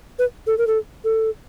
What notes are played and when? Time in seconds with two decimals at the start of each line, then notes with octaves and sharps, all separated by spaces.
0.19 B4
0.47 A4
0.58 A#4
0.67 A4
1.04 A4